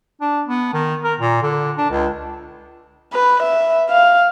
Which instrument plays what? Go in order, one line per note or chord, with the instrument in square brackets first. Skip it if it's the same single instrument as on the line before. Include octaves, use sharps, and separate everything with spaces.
[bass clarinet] D4
B3
D#3
A#4
A#2
D3
D4
C#2
[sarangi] B4
E5
F5